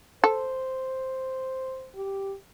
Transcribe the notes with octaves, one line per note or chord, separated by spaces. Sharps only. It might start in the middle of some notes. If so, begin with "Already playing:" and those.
A4 C5
G4